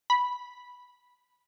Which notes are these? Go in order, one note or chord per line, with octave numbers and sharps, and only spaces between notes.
B5